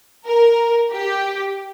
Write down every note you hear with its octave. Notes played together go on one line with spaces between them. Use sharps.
A#4
G4